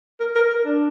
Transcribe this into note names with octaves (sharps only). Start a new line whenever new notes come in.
A#4
A#4
A#4
D4